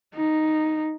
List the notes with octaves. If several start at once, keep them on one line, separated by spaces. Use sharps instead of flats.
D#4